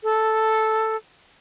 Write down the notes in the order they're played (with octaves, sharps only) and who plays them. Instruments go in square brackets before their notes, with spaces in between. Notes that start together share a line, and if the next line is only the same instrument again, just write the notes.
[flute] A4